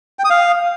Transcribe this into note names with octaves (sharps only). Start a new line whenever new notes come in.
G5
D#6
F5